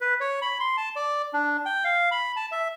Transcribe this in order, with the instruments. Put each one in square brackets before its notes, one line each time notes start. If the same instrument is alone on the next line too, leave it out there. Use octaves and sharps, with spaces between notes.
[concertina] B4
C#5
B5
C6
A5
D5
D4
G5
F5
B5
A5
E5